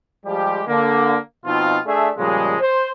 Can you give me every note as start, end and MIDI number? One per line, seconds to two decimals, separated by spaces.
0.25 0.62 53
0.25 0.62 55
0.25 0.62 56
0.25 0.62 67
0.67 1.16 50
0.67 1.16 58
1.45 1.77 47
1.45 1.77 53
1.45 1.77 60
1.45 1.77 63
1.45 1.77 65
1.85 2.09 57
1.85 2.09 62
1.85 2.09 68
1.85 2.09 74
1.85 2.09 76
2.17 2.55 46
2.17 2.55 49
2.17 2.55 53
2.17 2.55 55
2.17 2.55 56
2.60 2.91 72